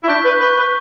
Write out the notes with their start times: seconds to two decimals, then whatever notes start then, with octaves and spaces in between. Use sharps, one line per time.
0.04 E4
0.08 D4 C#6 G6 B6
0.24 B4
0.40 B4 C#6 G6 B6
0.57 B4